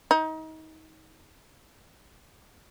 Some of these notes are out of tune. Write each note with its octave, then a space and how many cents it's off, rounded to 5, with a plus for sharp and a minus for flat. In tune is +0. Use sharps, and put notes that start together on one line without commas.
D#4 +30